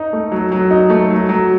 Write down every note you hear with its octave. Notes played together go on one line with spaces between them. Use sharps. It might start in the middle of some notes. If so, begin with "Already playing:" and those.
Already playing: D#4
A3
F#3
F#3
D#4
A3
F#3
F#3